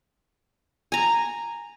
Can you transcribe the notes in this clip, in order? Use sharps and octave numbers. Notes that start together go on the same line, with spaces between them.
G#5 A#5